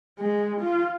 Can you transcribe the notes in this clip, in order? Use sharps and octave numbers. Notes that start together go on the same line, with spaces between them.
G#3
F4